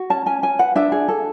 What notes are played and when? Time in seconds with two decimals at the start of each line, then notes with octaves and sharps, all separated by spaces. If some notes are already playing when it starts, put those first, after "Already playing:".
Already playing: F#4
0.10 C#4 A5
0.26 C#4 G#5
0.43 C#4 G#5
0.59 B4 F#5
0.75 D4 E5
0.92 G#4
1.08 A4